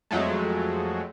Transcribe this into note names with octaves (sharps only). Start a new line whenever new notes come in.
F2 F#3 G#3 A3